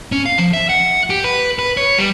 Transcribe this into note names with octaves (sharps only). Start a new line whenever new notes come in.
C#4
F5
F3
E5
F#5
G4
B4
B4
C#5
G3